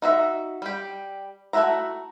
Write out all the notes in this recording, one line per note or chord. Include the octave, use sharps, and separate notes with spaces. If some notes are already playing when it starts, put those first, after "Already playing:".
D#4 F#4 E5
G3 G4
A3 E4 F#4 E5 A#5